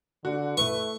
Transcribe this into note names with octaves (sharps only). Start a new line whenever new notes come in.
D3 F#4
A3 E4 B4 C#6